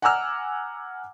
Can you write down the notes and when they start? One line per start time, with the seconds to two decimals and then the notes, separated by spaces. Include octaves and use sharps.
0.02 F#5 G#5 A#5 D6 E6 F6